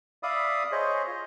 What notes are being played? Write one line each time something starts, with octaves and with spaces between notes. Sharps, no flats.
D5 E5 F5 B5 D#6
G#4 C5 C#5 D#5
F4